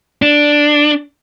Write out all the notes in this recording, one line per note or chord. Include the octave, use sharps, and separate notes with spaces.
D4